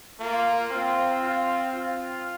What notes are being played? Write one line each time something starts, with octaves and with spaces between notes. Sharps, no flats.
A#3 F4
C4 F4
F4
F4